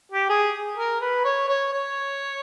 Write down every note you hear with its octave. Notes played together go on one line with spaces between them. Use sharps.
G4
G#4
A#4
B4
C#5
C#5
C#5